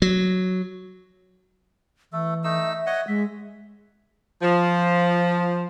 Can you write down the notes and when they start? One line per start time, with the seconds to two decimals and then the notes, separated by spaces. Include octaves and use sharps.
0.02 F#3
2.13 E3 A3 A4
2.44 A3 D#4 E6
2.66 E5
2.86 C#5 D#5 F#5
3.08 G#3 E5
4.42 F3